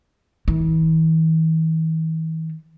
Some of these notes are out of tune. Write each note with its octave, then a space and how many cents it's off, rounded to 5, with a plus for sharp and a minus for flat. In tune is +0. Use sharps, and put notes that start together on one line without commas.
E3 -45